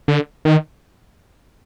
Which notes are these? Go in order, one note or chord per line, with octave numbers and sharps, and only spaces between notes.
D3
D#3